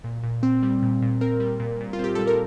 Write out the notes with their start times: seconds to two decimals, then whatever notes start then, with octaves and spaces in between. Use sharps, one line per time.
0.04 A#2
0.23 A#2
0.43 C4
0.63 G3
0.82 A#2
1.02 A#2
1.21 C4 A#4
1.40 G3
1.60 A#2
1.80 A#2
1.93 F4
1.99 C4 G4
2.15 G3 A4
2.27 A#4